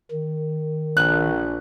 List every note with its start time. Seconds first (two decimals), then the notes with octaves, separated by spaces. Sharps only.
0.11 D#3
0.97 A#1 F#6